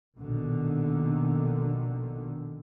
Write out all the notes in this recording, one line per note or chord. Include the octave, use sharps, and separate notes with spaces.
A#1 B2 D3 D#3